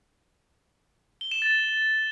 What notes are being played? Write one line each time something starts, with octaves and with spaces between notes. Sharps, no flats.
G7
E7
A6